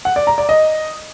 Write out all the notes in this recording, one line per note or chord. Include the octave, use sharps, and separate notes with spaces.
F#5
D5
A#5
D5
D#5